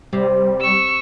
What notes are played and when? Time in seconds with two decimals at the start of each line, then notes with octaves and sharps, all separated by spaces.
0.13 C3 G3
0.60 C#6 E6